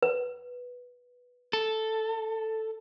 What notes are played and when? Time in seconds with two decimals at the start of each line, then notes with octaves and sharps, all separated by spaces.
0.03 B4
1.53 A4